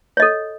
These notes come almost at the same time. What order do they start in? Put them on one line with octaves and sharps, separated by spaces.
C#5 D#5 A4